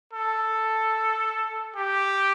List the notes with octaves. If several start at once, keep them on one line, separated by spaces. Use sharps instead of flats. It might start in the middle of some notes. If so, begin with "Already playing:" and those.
A4
G4